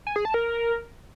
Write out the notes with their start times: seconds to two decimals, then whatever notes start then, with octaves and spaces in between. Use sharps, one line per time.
0.07 G#5
0.16 G#4
0.25 A5
0.34 A#4